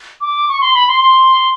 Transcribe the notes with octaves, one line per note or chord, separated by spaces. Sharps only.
D6
C#6
C6
B5
C6
C6